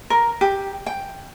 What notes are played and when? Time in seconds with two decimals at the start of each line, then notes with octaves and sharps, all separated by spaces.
0.10 A#4
0.41 G4
0.86 G5